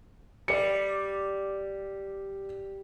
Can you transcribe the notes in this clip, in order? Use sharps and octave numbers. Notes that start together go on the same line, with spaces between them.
G3 D5 C#7